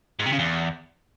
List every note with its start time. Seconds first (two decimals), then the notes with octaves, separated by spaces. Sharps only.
0.20 G#2
0.26 C3
0.32 C#3
0.39 E2